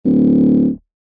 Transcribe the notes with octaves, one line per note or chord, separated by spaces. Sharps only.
D1